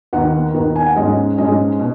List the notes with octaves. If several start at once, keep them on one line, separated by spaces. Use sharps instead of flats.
D#2 D#3 B3 F#5
D#2 D#3 B3
G#5
F#5
G#2 G#3 C#4 D#5
G#2 G#3 C#4 D#5
B2